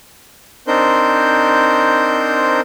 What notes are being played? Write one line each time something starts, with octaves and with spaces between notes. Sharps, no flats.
C4 D4 D#4 A#4 C5 G6